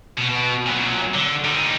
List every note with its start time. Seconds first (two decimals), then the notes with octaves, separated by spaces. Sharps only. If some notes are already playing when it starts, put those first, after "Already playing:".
0.18 B2 B3
0.29 B2
0.67 A#2 F#3
1.15 D3
1.44 G3 D#4